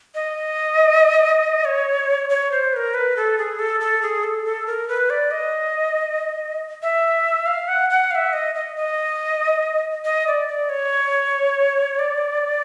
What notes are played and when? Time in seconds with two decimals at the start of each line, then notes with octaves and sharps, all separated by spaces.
0.15 D#5
1.65 C#5
2.29 C#5
2.51 C5
2.73 B4
2.76 A#4
2.94 B4
3.17 A4
3.38 G#4
3.59 A4
3.80 A4
4.02 G#4
4.23 A4
4.45 A4
4.66 A#4
4.88 B4
5.10 D5
5.31 D#5
6.82 E5
7.46 F5
7.68 F#5
7.90 F#5
8.11 F5
8.15 E5
8.33 D#5
8.55 D#5
8.76 D#5
10.05 D#5
10.27 D5
10.48 D5
10.69 C#5
11.99 D5